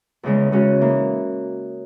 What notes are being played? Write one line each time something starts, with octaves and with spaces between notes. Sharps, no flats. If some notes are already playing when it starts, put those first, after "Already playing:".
E2 C#3 G#3
C#3 G#3 C#4 F#4
E3 A#3 D#4